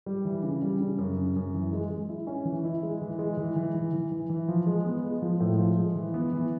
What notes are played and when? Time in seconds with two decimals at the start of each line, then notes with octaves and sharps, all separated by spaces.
0.06 G3
0.25 E3
0.43 C#3
0.62 G3
0.80 C#3
0.98 F#2
1.17 C#3
1.36 F#2
1.54 E3
1.73 G#3
1.90 G#3
2.09 E4
2.27 C#4
2.45 E3
2.65 E4
2.83 G#3
3.02 E3
3.19 G#3
3.37 E3
3.56 E3
3.74 E3
3.94 E3
4.11 E3
4.30 E3
4.48 F3
4.67 G#3
4.85 B3
5.04 G#3
5.22 F3
5.41 A2
5.58 F3
5.78 G#3
5.96 E3
6.14 B3
6.33 E3